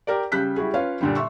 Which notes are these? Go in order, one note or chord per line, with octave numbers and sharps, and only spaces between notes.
G4 A#4 D5
C#3 G3 F#6 G6 B6
G3 E4 F#4 G#4
C#4 F4 B4 C#5 F5
A#2 D3 G3
E5 C6 C#6 E6